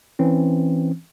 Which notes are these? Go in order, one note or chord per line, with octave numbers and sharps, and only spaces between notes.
E3 C4 C#4